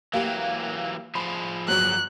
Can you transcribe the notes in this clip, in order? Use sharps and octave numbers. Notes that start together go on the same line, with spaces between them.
E3 F#3 A#3 G4 G5
F3 G#4 C5 B5
G1 F#3 F#6